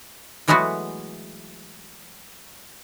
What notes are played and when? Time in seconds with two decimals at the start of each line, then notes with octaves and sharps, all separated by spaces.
0.48 E3 F#3 G#3 A3 B3 F#4